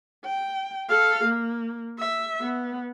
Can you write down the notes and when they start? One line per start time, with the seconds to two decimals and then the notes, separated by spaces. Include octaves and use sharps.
0.25 G5
0.89 A4 F5
1.24 A#3
1.99 E5
2.40 B3